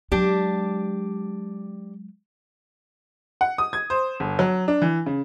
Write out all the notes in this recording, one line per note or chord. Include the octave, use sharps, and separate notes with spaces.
F#3 G#3 D4 G4
F#5
D#6
G#6
C5
G1
F#3
D4
E3
C#3